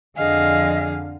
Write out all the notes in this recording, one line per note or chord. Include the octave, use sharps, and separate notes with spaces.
F2 D3 G#4 D#5 F5